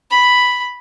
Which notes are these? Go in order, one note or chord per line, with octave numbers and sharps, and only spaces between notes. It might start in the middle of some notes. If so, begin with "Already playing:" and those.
B5